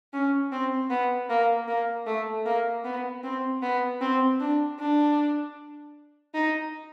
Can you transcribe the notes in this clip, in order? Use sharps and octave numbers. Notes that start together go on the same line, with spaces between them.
C#4
C4
B3
A#3
A#3
A3
A#3
B3
C4
B3
C4
D4
D4
D#4